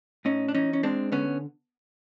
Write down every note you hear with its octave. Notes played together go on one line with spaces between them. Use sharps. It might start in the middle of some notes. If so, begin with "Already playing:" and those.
A2 C#4 D#4
D4
E3 C#4 D#4
C#4
G#3 C4 D4
D3 B3 C#4